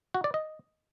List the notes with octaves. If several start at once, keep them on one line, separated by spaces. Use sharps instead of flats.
F#4
D5
D#5